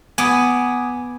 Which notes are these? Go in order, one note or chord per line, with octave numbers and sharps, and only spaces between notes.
B3 G#5 D6 D#6